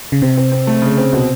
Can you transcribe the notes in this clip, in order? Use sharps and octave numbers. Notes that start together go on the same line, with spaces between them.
C#3
C3 C4
C4
C4
A3
C#3
C4
B2